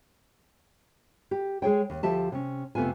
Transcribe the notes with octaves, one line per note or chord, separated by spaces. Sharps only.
G4
G#3 G#4 C#5 G5
D#2
D2 F3 G4 E5 A5
C3 C#4
F2 C3 A3 B3 F4 G#5